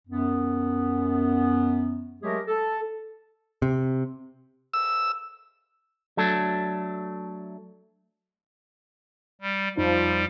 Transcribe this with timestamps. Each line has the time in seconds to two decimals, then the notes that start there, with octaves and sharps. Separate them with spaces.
0.08 F#2 B3
2.22 F#3 G#3 A3 G4 G#4 A#4
2.47 A4
3.62 C3
4.73 E6
6.17 F#3 A3 D4 A4
9.41 G3
9.77 F2 F3 G3 D#4